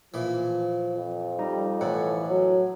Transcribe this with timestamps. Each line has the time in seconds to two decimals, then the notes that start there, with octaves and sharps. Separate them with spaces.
0.14 A#2 E3 F3
0.96 F2
1.39 G3 D#4
1.81 A2 E3 A4 C#5 F#5
2.30 F#3